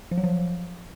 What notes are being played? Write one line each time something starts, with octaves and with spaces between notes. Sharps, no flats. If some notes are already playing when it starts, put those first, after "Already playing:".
F3
F#3
F3